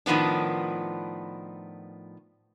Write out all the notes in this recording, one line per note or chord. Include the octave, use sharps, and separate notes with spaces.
A2 D#3 F3 B3 D4